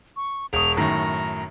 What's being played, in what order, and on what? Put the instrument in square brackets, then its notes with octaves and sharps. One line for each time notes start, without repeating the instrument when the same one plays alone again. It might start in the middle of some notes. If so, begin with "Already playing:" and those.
[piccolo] C#6
[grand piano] E1 C#6 D#6 [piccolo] F7
[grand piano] F#2 A2 D#3 [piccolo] A#5